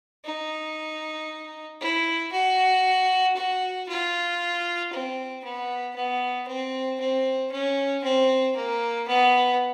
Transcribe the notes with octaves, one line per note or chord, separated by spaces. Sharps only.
D#4
E4
F#4
F#4
F4
C4
B3
B3
C4
C4
C#4
C4
A#3
B3